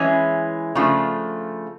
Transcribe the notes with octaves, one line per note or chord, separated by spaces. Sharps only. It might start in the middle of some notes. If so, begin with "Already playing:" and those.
Already playing: E3 G#3 C#4 E4 G#4
C#3 F3 A3 D4 F4